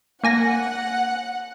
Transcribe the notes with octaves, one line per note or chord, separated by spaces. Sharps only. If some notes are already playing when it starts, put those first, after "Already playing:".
A#3 F#5 G#5 A#6